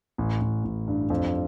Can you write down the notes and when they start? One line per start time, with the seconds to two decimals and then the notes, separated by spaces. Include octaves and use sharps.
0.18 A1
0.41 A1
0.64 A1
0.88 G2
1.10 F2